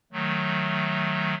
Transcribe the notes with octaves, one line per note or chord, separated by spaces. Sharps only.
D#3 F#3 A3